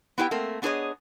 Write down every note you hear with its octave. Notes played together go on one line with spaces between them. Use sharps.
B3 E4 G4 E5 G5
A3 A#3 C4
B3 D4 G#4 A4 C#5 D#5